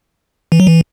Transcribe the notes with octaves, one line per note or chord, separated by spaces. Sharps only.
E3
F#3
E3